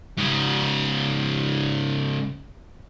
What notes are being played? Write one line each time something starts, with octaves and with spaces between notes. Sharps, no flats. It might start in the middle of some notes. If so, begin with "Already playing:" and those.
G#2 C#3